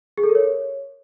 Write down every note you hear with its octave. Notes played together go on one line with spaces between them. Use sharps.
G#4
A4
A#4
C#5